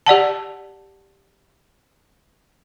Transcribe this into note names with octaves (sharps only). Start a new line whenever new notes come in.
G4 D5 F#5 A5